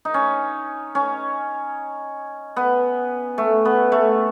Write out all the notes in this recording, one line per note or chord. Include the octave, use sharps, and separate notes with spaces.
D#4
C#4
C#4
B3
A3
B3
A3